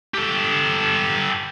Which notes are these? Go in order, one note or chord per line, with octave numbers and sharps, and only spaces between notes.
G4 A4